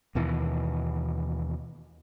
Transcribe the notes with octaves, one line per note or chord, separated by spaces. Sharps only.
D#2 B2 E3